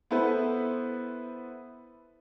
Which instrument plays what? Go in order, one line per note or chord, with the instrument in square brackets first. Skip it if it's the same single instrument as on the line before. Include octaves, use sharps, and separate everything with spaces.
[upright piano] B3 E4 A4 B4 C5